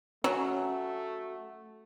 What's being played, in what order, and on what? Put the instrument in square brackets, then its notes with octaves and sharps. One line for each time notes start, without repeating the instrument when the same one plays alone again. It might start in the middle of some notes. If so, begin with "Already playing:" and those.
[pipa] F#3 [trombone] A3 [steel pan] C#4 [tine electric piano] F#4